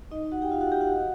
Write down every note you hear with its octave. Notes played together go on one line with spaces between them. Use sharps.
D#4 D#5
F#4 F#5
G4 G5
F4 F5
F#4 F#5
G4 G5
F#4 F#5